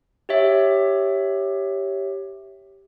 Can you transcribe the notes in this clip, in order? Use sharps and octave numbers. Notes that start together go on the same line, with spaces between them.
G4 C#5 E5